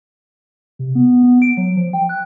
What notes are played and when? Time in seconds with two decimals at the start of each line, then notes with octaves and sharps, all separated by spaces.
0.79 C3
0.95 B3
1.23 B3
1.42 D7
1.57 F#3
1.76 F3
1.93 G5
2.09 F#6